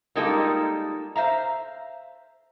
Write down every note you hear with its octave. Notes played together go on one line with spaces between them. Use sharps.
G3 G#3 A#3 D#4 F4 A4
C5 E5 F5 A#5